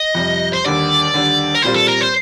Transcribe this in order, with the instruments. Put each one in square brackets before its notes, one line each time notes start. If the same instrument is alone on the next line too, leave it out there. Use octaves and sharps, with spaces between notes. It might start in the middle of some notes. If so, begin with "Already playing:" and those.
Already playing: [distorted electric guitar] D#5
[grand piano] F2 C3 G3
[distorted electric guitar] C5
[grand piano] D#2 D3 G3 [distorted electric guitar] D5
[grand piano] D#2 D3 G3
[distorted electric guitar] A#4
[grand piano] A#2 G3 C4 F4 [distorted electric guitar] C5
[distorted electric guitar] A4
A#4
C5